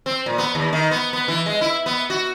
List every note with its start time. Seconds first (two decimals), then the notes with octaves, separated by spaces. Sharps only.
0.06 C4
0.26 A#2
0.38 B3
0.55 D#2
0.73 D#3
0.91 B3
1.13 B3
1.28 E3
1.46 G#3
1.61 E4
1.86 B3
2.10 F#4